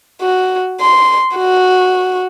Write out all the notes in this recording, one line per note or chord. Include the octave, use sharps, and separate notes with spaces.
F#4
C6
F#4